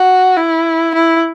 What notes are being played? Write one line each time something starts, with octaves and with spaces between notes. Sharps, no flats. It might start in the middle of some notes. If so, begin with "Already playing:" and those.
Already playing: F#4
E4
E4